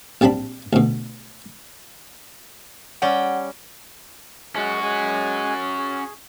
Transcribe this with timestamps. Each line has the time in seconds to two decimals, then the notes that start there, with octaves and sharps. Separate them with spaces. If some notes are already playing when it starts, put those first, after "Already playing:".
0.21 A#1 G3 C4 D4 B5
0.73 D2 B2
3.02 G3 C#4 F#5 G5
4.55 G#3 C#4 F#4
4.83 G#3 G#5
5.78 G#4